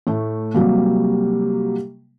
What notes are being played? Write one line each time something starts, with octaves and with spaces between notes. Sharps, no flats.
A2 A3
C3 F#3 G3 A#3